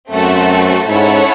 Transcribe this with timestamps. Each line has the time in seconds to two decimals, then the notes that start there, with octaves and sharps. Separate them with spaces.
0.11 F#2 A3 C4 F#4 A4
0.89 G#2 C#4 E4 A4 C#5 F#5